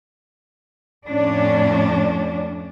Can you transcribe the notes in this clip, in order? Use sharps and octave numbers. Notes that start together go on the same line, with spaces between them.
F2 A2 C#4 D4